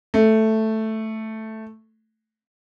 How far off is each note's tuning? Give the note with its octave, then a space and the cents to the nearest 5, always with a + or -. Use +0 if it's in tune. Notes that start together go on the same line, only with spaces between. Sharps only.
A3 +0